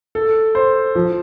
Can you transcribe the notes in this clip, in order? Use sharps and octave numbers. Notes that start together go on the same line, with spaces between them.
A4
C5
F3